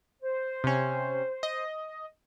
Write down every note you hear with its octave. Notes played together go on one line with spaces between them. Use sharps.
C5
C3 C#4
D#5